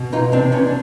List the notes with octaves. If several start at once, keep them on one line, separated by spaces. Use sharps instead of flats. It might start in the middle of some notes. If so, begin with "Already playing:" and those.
Already playing: B2
E3 D#4 F4
C3 C4 D4
E3 B3 C#4
D4